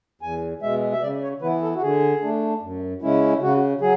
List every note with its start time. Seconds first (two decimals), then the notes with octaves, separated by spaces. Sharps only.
0.22 E2 G#5
0.62 B2 G#3 E5
0.92 E5
1.01 C#3 D5
1.23 C#5
1.41 E3 B3 E4 B4
1.62 A4
1.76 F#4
1.81 D3 G#4
2.22 A3 D4
2.62 F#2
3.02 C#3 G#3 C#4 E4
3.42 C#3 F#4
3.81 F#3 G#4